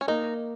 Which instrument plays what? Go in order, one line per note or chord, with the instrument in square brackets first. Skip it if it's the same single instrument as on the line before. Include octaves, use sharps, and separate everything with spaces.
[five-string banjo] C#4
[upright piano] A#3 [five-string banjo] D#4